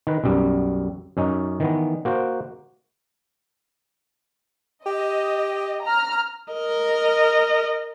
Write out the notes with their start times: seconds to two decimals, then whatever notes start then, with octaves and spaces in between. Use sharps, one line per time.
0.07 D#3 B4
0.24 B1 F#2 G3
1.17 F#2 C#4 D#4
1.60 D#3 E3 B3
2.05 A#3 F#4 C5
4.86 G4 D#5
5.84 A#5 F6
6.53 A#4 D#5